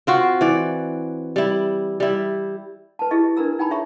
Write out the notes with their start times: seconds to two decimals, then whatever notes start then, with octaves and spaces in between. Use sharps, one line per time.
0.07 C4 F4 F#4
0.41 E3 D5
1.36 G3 E4
2.00 G3 E4
2.99 B4 A5
3.11 E4 G4 G#4 D#5 C#6
3.37 D4 A#4 B4 A#5 E6
3.59 D#4 G5 G#5 A#5 B5
3.71 G#4 C#5 E5 A#5 C#6